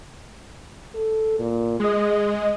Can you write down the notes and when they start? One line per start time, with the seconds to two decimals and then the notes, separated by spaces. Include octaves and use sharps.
0.94 A4
1.39 A#2
1.80 G#3 G#4 D#5